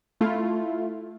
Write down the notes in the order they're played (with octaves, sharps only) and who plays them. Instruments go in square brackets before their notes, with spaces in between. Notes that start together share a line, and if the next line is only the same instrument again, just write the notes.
[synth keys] A3 E4 F4